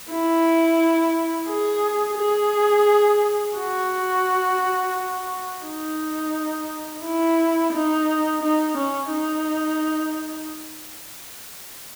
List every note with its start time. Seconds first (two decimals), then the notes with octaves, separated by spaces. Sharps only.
0.10 E4
1.48 G#4
2.18 G#4
3.57 F#4
5.64 D#4
7.04 E4
7.73 D#4
8.43 D#4
8.78 C#4
9.12 D#4